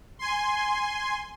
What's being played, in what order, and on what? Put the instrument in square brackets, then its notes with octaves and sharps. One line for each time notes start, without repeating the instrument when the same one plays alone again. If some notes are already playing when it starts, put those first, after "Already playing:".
[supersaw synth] G#5 C6